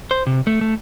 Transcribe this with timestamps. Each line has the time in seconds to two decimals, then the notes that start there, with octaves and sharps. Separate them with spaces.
0.11 C5
0.27 C3
0.47 A3
0.61 A3